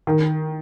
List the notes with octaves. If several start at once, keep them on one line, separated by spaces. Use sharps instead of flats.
D#3